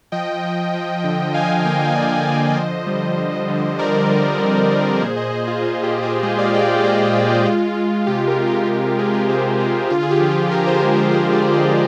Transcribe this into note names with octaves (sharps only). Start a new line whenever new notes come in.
F3 D#5 G5
F3
F3
D3
D3 F5 G#5
A#3 D#5 G5
G5
F3 D5 F5
D#5 G5
F3
D5 F5
D3 C5 D#5
G3
D3
D3
G3 A#4 D5
G3
C4
C4
A#2 G#4 C5
C5 D#5
A#2 G#4 C5
F4 G#4
A#2 F4 G#4
G4
A#2
G#4 C5
G#3 F4 G#4
D5 F5
G#3 D#5 G5
A#2 C5 D#5
G#3
G#3 F4
G#3
C3 G4
G4 A#4
C3
G4 A#4
C3 F4
G#3 F4 G#4
G4 A#4
C3 G#4 C5
C3 F4
D3 F4
G#4
G4
F3
F4 G#4
F3 G4 A#4
G#4 C5
G#3 G#4 C5
G4 A#4
F3 G#4 C5
A#4 D5
G#3
C5 D#5